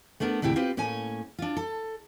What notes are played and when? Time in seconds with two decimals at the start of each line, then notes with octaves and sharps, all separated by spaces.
0.20 A3 B3 D4 A#4
0.42 D2 A2 C3 E4 G5
0.56 C4 F4 G4 B4
0.77 A2 A#3 C#4 C#5 G#5
1.39 D4 F4
1.57 A4